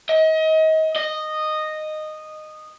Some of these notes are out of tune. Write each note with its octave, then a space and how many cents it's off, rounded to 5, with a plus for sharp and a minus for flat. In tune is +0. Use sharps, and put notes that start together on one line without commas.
D#5 +30
D#5 -10